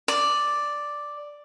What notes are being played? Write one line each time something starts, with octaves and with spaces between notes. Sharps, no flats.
D5